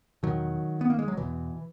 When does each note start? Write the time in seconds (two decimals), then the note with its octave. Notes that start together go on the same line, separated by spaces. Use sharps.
0.23 E2 B2 D#3 F#3
0.81 B3
0.90 A#3
0.99 G#3
1.08 F#3
1.17 E2 B2 E3